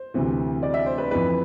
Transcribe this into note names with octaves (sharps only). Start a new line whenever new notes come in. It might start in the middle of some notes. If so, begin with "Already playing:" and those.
Already playing: C5
D2 C3 E3
D5
E5
C5
B4
F2 E3 B4